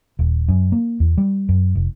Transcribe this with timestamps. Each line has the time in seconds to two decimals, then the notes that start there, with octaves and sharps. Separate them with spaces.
0.19 D#1
0.48 F#2
0.72 A#3
1.00 E2
1.18 G3
1.49 F#2
1.75 F1